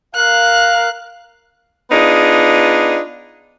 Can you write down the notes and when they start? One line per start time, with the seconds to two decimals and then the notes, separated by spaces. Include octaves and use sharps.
0.16 A#4 F5 F#6
1.91 B3 D4 D#4 F4 G#4